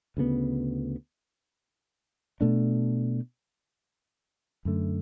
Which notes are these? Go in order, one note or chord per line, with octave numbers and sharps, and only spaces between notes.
D2 C#3 G#3 B3
B2 A3 D4
F#2 D3 A3